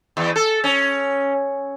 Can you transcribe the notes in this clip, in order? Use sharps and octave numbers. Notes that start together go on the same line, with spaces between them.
E2
A4
C#4